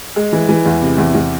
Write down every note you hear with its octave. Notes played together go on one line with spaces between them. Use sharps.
G#3
E3
E3
E2
C3
E2
E2